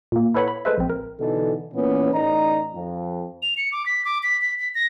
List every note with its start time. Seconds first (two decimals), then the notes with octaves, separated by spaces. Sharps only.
0.12 A#2 A#3
0.34 E4 A4 B4 C#5 F#5 B5
0.48 B5
0.65 G#3 A4 B4 C5 E5
0.78 A#1 C4
0.90 A#4
1.19 B2 D3 E3 D#4 A4
1.74 A#2 E3 B3 C#4
2.13 A1 D#4 D5 A#5
2.74 F2
3.42 F7
3.57 C#7
3.72 D6
3.86 B6
4.05 D6
4.23 B6
4.41 B6
4.59 B6
4.75 A#6